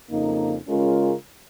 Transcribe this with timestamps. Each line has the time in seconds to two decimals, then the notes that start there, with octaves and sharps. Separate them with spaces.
0.11 F2 C#3 A#3 D#4
0.68 C#3 G#3 C#4 F4 A#4